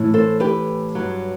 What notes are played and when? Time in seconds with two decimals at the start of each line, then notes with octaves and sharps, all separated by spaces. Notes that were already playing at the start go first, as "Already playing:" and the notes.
Already playing: A2 E3
0.14 A4 C5
0.40 G4 B4
0.95 G2 F#3